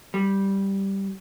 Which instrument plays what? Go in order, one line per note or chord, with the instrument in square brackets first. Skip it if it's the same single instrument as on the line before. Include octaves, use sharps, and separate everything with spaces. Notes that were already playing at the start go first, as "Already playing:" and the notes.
[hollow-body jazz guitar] G3